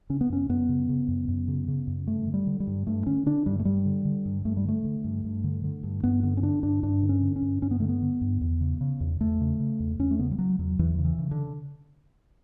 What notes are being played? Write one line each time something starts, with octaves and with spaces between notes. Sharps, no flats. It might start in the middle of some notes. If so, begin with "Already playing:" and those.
C#3 C#4
B3
F#2 C#4
F#2 B3
C#3
C#3
F#2
F#2
C#3
C#3
F#2
G2 A3
D3
G3
D3
G3
G2
G2 A3
D3 C#4
D3 D4
G2 G3
A3
G2 G3
D3
D3
G2
G2 A3
G3
D3 A3
D3
G2
G2
D3
D3
G2
G2 B3
D3 B3
C#4
D3 D4
G2 D4
G2 D4
D3
C#4
D3
C#4
G2
G2 C#4
B3
D3 A3
B3
D3
G2
E2
C#3
C#3
E2
E2 A3
C#3
C#3
E2
E2 C#4
A3
C#3 B3
G3
C#3 F#3
E2 F#3
E2 E3
C#3
E3
C#3
D3